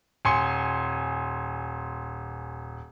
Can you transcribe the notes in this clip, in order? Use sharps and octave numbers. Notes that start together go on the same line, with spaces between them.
D#1 G#5 C6 C#7